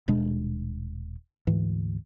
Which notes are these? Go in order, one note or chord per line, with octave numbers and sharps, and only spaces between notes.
D#1 B2 G#3 D4
D2 G#2 E3